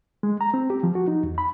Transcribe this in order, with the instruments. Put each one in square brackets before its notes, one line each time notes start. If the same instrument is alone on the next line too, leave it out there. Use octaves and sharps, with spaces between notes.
[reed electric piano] G#3
A#5
C4
G4
F3
F#4
D#4
E2
B5